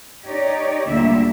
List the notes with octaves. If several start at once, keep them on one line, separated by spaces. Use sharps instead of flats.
D#4 G4 C#5 D5
D2 A#2 D3 G3 A#3 E5